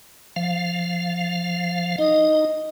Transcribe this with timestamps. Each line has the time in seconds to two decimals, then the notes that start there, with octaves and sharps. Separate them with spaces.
0.36 F3 F5
1.98 D#4 D#5